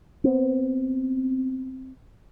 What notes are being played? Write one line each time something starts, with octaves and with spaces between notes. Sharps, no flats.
B3 C4